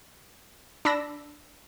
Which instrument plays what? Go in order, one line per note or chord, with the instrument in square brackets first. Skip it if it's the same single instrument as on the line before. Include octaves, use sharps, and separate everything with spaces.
[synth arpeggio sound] D4 B5 E6 A#6